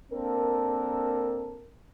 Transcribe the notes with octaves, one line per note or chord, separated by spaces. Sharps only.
A#3 C4 D4 A4 A#4